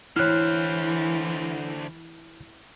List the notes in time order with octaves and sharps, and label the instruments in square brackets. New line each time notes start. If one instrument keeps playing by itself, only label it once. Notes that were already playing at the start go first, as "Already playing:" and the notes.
[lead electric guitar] D3 C5 [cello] E3 [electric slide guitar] E4 C#5 [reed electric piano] F6 F#6